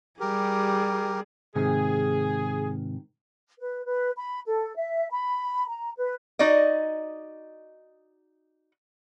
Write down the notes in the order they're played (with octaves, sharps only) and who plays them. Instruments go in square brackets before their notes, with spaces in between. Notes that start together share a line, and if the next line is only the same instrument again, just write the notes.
[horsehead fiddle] G3 G#4 [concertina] G4 A#4
[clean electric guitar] G#2 C3 D#3 [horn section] G#4
[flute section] B4
B4
B5
A4
E5
B5
A#5
B4
[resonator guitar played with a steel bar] D#4 F#4 D5 D#5